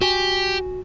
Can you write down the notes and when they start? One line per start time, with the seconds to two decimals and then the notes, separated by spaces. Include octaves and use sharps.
0.02 F#4 G4 G#5